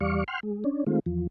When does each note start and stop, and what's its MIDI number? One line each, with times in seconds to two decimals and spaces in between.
0.01 0.24 40
0.01 0.24 55
0.01 0.24 74
0.01 0.24 77
0.01 0.24 85
0.28 0.40 78
0.28 0.40 79
0.28 0.40 84
0.28 0.40 89
0.43 0.64 56
0.64 0.84 61
0.64 0.84 62
0.87 0.99 51
0.87 0.99 56
0.87 0.99 57
0.87 0.99 60
0.87 0.99 65
1.06 1.27 40
1.06 1.27 53